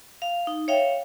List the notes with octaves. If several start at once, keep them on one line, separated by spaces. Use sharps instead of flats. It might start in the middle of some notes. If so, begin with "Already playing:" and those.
F5
D#4
C#5 E5 F5 G5